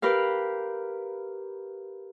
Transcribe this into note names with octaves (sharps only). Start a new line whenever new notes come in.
G4 A#4 B4 F5